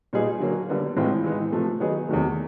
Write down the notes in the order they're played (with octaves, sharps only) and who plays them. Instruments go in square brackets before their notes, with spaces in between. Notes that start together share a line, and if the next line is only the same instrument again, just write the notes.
[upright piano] A#2 G3 B3 D#4 G#4
D3 F#3 A#3
D3 G3 B3
A2 E3 G#3 C4 F4
E3 G#3 B3 D#4
C3 F3 A3
D#3 F#3 B3 D#4 G#4
E2 C3 D#3 F#3 A3